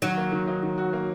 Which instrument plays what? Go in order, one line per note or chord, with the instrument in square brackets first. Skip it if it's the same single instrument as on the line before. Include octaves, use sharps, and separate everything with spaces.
[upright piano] D#3 [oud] F#3
[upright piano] A#3
D#3
D#4
D#3
F#4
A#3